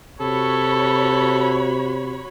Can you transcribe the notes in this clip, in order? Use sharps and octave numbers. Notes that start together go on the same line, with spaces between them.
C3 F#4 A4 C#5 B5